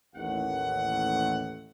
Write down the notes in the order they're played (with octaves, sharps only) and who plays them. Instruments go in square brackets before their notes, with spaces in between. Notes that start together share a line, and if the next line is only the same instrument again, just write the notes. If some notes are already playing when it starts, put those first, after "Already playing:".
[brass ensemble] A1 D#2 F#5